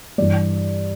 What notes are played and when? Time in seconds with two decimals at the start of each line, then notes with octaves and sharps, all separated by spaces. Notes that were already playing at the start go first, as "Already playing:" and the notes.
0.18 G2 E3 G3 D5